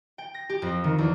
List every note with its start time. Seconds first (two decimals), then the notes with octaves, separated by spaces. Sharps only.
0.18 G5
0.34 A#6
0.49 G4
0.62 F2
0.84 D#3
0.98 E2